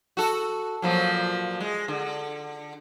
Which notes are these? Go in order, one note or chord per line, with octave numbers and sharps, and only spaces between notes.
F#4 A4
A#2 F3 F#3
G#3
D3